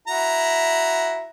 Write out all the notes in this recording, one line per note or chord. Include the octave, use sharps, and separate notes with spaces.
E4 F#4 A#5